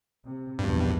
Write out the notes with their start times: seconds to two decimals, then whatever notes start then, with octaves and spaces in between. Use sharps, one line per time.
0.23 C3
0.59 A#1 E2 G2 B2